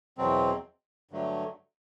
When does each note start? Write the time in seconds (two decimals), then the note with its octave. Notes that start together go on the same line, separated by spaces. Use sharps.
0.18 E2 B2 F#3 C4
1.11 G2 D3 F#3 A3